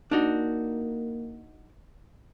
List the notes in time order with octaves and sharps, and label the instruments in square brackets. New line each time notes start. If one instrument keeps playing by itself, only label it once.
[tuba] A#3 [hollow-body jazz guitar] D4 D#4 F#4